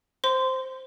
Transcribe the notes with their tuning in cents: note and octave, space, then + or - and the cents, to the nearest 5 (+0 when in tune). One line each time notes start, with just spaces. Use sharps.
C5 +0 C6 -20